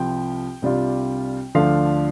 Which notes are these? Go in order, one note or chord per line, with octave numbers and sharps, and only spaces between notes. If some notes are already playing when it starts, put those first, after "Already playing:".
Already playing: C2 C3 F3 G5
C2 C3 G3 D4 F4
D2 D3 F3 A3 D4 F5